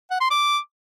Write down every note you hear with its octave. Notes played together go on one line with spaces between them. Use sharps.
F#5
C6
D6